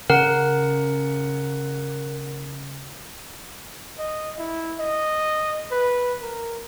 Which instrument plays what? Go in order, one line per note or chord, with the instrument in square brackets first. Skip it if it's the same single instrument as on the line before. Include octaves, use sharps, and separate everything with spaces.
[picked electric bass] C#3 C#4 [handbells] A#4 [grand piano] F#5
[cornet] D#5
E4
D#5
B4
A#4